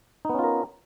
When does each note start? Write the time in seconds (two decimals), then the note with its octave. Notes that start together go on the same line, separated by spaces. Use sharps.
0.25 D#4
0.29 B3
0.34 C#4
0.39 F4
0.44 A#4